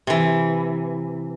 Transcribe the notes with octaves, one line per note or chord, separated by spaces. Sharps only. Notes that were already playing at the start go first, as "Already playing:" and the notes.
C3 E3